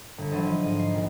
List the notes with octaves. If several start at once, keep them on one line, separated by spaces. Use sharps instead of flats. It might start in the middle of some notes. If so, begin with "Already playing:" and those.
G1
E3 F#3 D4 C5 D#5
F3
G#2 D#5
C7
A#1